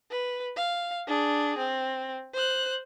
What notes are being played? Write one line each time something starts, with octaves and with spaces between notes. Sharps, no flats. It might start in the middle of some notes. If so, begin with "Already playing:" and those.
B4
F5
D4 G#4
C4
C5 F#6